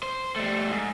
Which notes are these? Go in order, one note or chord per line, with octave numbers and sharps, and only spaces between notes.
C5
G3 A3
G#2